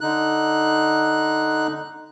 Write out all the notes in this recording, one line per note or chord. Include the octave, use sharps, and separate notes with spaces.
D3 D#4 F#6